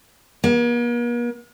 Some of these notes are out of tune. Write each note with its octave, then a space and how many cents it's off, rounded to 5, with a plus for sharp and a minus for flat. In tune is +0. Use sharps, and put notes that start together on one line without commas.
A#3 +45